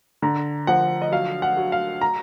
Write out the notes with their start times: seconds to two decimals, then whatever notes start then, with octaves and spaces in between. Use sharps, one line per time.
0.22 D3 A#5
0.67 F3 F#5
1.02 D#5
1.12 F#3 F5
1.42 F#5
1.57 F#3
1.72 F5
2.01 A#5